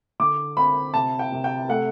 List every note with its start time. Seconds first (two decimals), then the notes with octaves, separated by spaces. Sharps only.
0.20 D3 D6
0.57 C4 B5
0.94 C3 A5
1.19 G5
1.32 C3
1.44 G5
1.69 A3 F#5